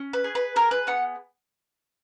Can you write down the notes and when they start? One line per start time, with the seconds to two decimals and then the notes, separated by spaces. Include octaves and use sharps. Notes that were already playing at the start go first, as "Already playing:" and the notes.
Already playing: C#4
0.13 B4
0.24 G#4
0.35 B4
0.56 G#4 A#4
0.71 B4
0.87 B3 F#5